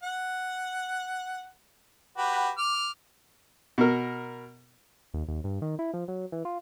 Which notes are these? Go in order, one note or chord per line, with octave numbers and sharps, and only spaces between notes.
F#5
F#4 G4 B4
D6 F6
B2 A#4
D#2
D#2
G2
D#3
E4
F3
F#3
E3
F4